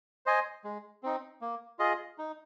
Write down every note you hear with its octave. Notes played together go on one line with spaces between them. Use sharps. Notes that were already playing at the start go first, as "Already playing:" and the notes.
C5 D#5 G#5
G#3
C4 D#4
A#3
F4 G#4 D#5
D#4